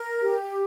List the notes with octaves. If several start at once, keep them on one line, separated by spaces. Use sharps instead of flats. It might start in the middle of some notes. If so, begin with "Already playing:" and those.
Already playing: A#4
G4